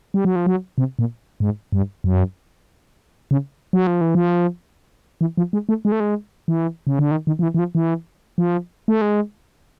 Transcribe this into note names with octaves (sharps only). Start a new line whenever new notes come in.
G3
F#3
F3
F#3
C3
A#2
G#2
G2
F#2
C#3
F#3
F3
E3
F3
E3
F3
G#3
A3
G#3
A3
G#3
E3
C#3
D3
D#3
D#3
F3
E3
E3
F3
E3
F3
A3
G#3